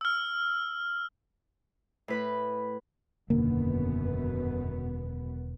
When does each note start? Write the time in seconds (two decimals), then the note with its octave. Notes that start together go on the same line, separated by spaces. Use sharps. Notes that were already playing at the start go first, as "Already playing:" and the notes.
0.01 E6 F6
2.08 A2 B4 B5
3.30 E1 F#2 B2 D3 D#3 A#3 B3